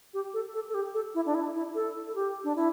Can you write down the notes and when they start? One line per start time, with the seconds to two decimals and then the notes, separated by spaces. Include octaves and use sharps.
0.14 G4
0.34 A4
0.54 A4
0.69 A4
0.74 G4
0.94 A4
1.15 E4
1.26 D4
1.35 E4
1.55 E4
1.75 A4
2.07 A4
2.15 G4
2.44 D4
2.56 E4